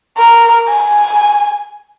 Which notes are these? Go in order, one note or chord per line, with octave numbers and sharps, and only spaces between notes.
A#4
G#5